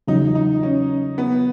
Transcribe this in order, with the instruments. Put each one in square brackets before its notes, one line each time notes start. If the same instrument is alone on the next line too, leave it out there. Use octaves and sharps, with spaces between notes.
[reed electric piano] E2 C#3 F#3 [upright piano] D#4
[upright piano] D#4
C#4
B3